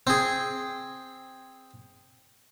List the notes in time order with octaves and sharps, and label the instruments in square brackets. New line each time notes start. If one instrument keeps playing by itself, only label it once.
[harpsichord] C4 G#4